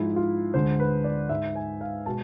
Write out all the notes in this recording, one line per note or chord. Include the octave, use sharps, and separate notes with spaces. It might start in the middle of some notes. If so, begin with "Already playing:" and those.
Already playing: G#2 F3 G#3 E4
F4
D2 D3 G#3 C5
B4
D5
G#2 G#3 E5
G#5
F5
B2 G#3 A5